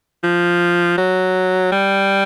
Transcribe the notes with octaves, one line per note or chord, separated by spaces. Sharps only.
F3
F#3
G3